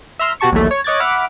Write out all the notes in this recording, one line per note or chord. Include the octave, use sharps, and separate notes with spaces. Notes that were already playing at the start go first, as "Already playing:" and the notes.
E5 A#5 C6 F6
B2 F#4 G4 A5 C#6 C#7
A#1 D#2 E3 F#3 A3
C#5
C#5 D#5 D6 F#6 G#6 A6
E5 F#5 B5 D6 F6